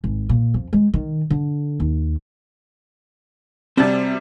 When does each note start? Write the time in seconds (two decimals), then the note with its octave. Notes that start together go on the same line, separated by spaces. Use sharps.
0.04 G#1
0.29 A#2
0.54 F2
0.73 G#3
0.94 D#3
1.30 D3
1.80 D#2
3.77 C3 G3 C4 F#4 A5